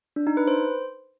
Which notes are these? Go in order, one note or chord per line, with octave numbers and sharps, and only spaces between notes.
D4
D#4
B4
C5